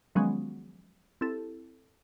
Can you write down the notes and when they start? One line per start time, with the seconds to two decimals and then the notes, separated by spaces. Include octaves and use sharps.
0.15 D#3 F3 F#3 G#3 B3 C#4
1.21 C4 E4 G4 A4